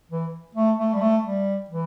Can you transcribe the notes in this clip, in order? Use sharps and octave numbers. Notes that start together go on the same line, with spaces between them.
E3
A3
A3
G3
A3
G3
E3